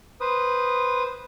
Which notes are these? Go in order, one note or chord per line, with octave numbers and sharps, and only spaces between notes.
B4 C5 D#6